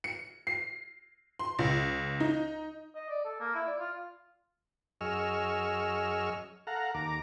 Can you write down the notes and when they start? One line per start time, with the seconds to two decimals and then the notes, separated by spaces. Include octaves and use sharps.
0.04 C#7
0.47 C7
1.39 C6
1.59 C#2
2.20 D#4
2.96 D#5
3.10 D5
3.25 A4
3.40 A#3
3.55 E4
3.67 D5
3.79 F4
5.01 F#2 G#4 D#5 C#6 E6 F6
6.67 A4 F5 F#5 A#5
6.94 D#2 A#5 D6